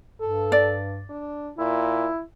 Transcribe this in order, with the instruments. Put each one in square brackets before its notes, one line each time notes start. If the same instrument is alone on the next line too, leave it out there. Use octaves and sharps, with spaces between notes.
[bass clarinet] G2 [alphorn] A4
[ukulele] D5
[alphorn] D4
[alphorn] A#2 [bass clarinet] E4